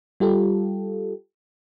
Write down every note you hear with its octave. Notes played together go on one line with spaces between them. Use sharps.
G3 F4 G4 A4